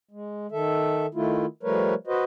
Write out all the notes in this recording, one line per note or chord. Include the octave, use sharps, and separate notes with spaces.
G#3
D#3 A4 E5
D#3 A3 E4 F4
F3 G3 A3 A#4 B4 C#5
F#4 B4 C5 D#5